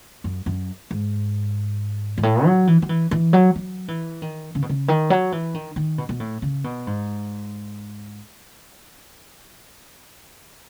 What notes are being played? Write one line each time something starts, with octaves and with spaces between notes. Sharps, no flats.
F#2
F#2
G#2
G#2
A2
F#3
E3
F#3
E3
E3
F#3
F#3
E3
D#3
C#3
B2
C#3
D#3
F#3
E3
D#3
D#3
B2
B2
A2
C#3
B2
G#2